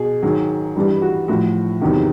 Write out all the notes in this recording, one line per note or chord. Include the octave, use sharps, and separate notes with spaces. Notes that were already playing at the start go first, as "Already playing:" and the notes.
Already playing: B2 G#4
G#2 D#3 F#3
G2 E3 G3
F#4
A2 F3 F#4
E2 C3 D#3 F#3